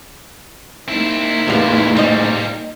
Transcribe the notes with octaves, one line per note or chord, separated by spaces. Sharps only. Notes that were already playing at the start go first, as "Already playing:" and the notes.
A#3 C4 D#4 E4
E2 A2 F4 G4 G#4 B4
A#2 G3 C5 D#5